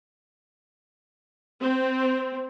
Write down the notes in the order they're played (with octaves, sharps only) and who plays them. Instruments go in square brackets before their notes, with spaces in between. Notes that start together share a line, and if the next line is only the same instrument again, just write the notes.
[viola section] C4